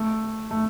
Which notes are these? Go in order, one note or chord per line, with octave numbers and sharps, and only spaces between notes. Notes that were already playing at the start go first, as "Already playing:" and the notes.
Already playing: A3
A3